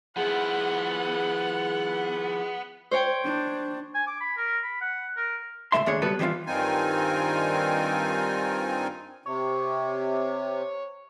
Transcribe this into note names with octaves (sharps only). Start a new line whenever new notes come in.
F3 B3 E4 G#4 F#5
C5 C#5 G5
D4
G#5
D6
B5
A#4
B5
F#5
A#4
C#2 G2 A3 E5 C6
D#2 A3 D4 G#4 C5 C#5
C#3 G3 B3 F#4 A4 B4
E3 G3 C4 C#4 F4
G2 D#3 C4 D#4 F4 G#5
C3 C#5